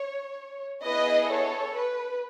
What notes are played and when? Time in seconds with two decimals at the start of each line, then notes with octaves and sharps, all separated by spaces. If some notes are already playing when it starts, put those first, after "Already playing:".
Already playing: C#5
0.84 B3 E4 G#4 B4 D#5
1.29 A4 C#5
1.75 B4